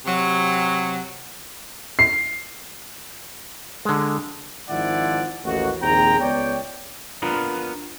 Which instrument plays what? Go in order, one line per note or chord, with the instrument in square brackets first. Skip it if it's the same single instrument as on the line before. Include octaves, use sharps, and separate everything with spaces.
[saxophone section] C3 F#3
[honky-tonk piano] C7
[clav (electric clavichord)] D3 G#3
[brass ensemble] G#1 D#3 F3 E4 D5 F#5
A1 D#2 F#4
A#1 D#2 C4 G#4 G5 A#5
C#2 B3 C#5 D5 G5
[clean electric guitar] B3 D4 F4 A#4 B4